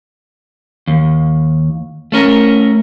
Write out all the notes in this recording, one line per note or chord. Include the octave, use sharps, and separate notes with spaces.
D#2
A3 C#4 A#4